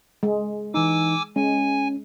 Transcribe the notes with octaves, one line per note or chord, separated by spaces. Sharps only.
G#3
E3 D#4 G#5 D6 E6
G#3 C#4 G#5